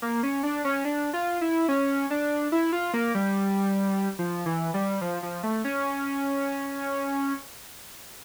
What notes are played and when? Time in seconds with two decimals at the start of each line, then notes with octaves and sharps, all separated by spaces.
0.02 A#3
0.23 C#4
0.43 D4
0.65 C#4
0.85 D4
1.13 F4
1.41 E4
1.69 C#4
2.10 D4
2.52 E4
2.73 F4
2.94 A#3
3.15 G3
4.19 F3
4.46 E3
4.74 G3
5.01 F3
5.23 F3
5.43 A3
5.64 C#4